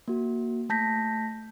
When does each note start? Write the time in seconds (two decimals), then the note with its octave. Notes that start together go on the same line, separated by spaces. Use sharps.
0.08 A#3 F#4
0.69 A3 A5 G6 A#6 B6